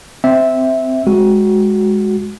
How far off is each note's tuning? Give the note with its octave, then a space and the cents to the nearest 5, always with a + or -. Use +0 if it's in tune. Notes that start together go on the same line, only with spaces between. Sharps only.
C4 -10 E5 -10
G#3 +0 F#4 +0